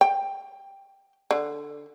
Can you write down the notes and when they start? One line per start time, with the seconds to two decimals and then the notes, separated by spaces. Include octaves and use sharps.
0.01 G5
1.31 D3